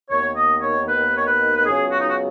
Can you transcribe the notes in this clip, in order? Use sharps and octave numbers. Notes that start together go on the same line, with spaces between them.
D#2 D#3 B3 C#5
D#5
C#5
B4
C#5
B4
B4
C#2 C#3 F#3 B3 G#4
F#4
D#4
F#4